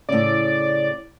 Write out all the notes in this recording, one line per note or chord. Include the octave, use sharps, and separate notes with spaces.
A2 C#3 D5